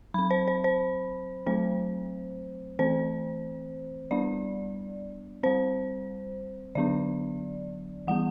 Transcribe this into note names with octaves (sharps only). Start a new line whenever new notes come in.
F#3 C4 B5
C5
C5
C5
F#3 A3 C4 C5
E3 A3 C4 C5
G3 B3 D4 D5
G3 C4 C5
D3 F#3 B3 D4 D5
E3 G3 B3 F#5